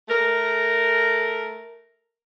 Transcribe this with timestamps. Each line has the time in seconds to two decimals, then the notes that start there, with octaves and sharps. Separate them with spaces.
0.09 A3 A#4